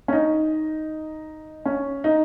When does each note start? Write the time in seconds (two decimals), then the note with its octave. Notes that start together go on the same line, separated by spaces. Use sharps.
0.08 C#4
0.13 D#4
1.65 C#4
2.04 D#4